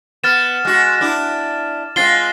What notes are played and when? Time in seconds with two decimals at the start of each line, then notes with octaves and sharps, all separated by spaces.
0.24 B3 F6 A6 E7
0.65 G#3 F#4
1.01 D4 E4
1.96 G#3 C4 F4 A6 C7 G7